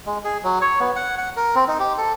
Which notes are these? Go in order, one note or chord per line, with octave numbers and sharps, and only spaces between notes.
G#3
G#4
F#3
C#5
B3
F#5
F#5
A#4
C4
D#4
G4
A4